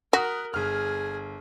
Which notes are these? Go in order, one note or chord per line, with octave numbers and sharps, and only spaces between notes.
F#4 A#4 D#6 F#6 B6
G1 G#4 F6